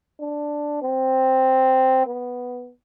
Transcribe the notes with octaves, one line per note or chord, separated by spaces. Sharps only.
D4
C4
B3